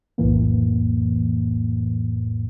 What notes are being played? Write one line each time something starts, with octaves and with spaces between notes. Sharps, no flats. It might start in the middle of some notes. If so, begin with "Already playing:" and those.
B1 F2 A2 E3 A#3